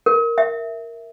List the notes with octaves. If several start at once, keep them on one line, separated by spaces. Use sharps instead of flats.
A#4
E5